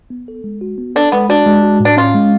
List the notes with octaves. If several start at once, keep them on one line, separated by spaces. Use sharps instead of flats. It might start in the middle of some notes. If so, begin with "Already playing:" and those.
B3
A4
G#3
F#4
B3
D4 A4
G#3 B3
D4 F#4
G#3
F#4
A2
D4
C#4 F4
G#3